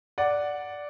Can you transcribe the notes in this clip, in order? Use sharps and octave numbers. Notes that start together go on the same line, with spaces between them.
D5 F#5